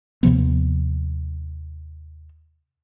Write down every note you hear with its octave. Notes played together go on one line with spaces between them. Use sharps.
D#2 C3 F3 B3